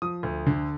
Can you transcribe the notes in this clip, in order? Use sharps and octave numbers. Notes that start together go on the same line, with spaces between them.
F3 D#6
D2
D3